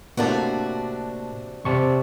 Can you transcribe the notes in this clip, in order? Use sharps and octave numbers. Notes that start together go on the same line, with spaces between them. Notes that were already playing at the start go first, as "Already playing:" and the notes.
A2 C3 A#3 D4 F#4 A5
C3 D5 A5 C#6